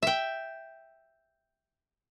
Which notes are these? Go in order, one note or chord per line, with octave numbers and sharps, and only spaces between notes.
E5 G5